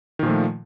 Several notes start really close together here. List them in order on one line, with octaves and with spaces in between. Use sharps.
D#3 A#2 F3 A3